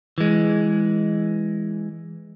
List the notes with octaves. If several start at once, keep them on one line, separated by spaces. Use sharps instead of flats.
E3 G#3